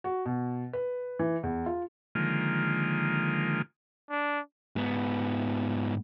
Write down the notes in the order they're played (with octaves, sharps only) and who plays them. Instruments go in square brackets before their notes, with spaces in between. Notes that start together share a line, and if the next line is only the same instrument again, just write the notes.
[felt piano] F#4
B2
B4
E3
E2
F4
[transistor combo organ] D3 D#3 F3 G#3 A#3 F4
[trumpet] D4
[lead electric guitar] G#2 B3